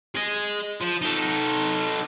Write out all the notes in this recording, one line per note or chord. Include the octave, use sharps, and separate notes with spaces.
G#4 D#5
F3
D#4 A4